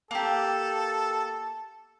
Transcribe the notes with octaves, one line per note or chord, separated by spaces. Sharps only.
A#3 G4 A4